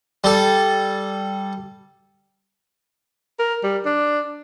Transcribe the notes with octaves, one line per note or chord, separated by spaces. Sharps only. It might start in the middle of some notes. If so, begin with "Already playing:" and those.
G3 A4
A#4
G3
D4